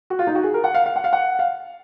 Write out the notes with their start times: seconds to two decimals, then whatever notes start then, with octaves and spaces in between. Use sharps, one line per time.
0.10 F#4
0.19 F4
0.27 D#4
0.35 F#4
0.43 G#4
0.54 A#4
0.64 F#5
0.74 F5
0.86 F5
0.96 F#5
1.04 F5
1.13 F#5
1.39 F5